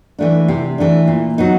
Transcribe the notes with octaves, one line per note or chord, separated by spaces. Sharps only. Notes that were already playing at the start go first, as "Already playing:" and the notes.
E3 A3 D4
C3
E3 A3 D4
A#2
F#3 B3 D#4